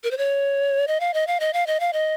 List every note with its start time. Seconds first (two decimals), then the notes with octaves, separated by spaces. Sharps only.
0.04 A#4
0.11 C5
0.18 C#5
0.88 D#5
1.00 F5
1.14 D#5
1.27 F5
1.40 D#5
1.53 F5
1.67 D#5
1.80 F5
1.93 D#5